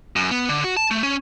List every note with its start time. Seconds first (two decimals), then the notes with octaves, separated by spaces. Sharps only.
0.16 F#2
0.31 B3
0.49 D3
0.64 F#4
0.77 A5
0.91 A3
1.03 C#4